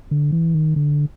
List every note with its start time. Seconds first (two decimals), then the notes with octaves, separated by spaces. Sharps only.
0.11 D3
0.32 E3
0.54 D#3
0.76 D3